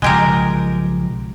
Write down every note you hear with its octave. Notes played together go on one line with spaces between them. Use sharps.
B1 C#3 F3 G#3 G4 A#4